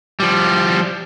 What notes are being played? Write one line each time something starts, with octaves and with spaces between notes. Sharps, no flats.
F3 G3